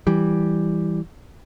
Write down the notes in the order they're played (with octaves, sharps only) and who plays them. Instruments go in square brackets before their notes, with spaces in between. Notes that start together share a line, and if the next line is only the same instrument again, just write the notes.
[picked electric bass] E3 G3